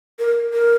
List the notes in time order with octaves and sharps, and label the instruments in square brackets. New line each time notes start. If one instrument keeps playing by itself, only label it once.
[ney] A#4
A#4